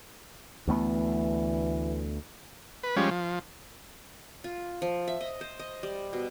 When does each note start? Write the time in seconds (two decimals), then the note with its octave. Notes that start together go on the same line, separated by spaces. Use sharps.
0.68 D2 E3 A3 B3
2.83 B4
2.96 F3 G3 G#3 C#4
3.11 F3
4.44 F4
4.82 F3
5.08 E5
5.21 D#5
5.41 C5
5.59 D#5
5.83 G3
6.13 B2